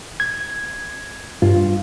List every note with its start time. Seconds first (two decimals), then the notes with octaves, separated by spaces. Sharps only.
0.20 G#6
1.42 G2 F4